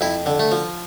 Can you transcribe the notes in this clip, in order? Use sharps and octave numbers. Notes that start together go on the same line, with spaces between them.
F2 E4
D3
A3
F3